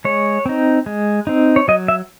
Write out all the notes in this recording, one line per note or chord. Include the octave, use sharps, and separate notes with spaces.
G#3 C#5
C4 D#4
G#3
C4 D#4
C#5
F#3 D#5
E5